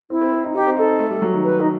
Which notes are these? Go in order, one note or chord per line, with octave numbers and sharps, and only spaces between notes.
C4 E4
C4
C4
D#4
D#4 G4
C4
D#4 A4
C4
A3
G3
F#3
D#3
B4
D#4